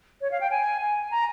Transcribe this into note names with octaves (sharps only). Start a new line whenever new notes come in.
C#5
F5
G5
G#5
G#5
A#5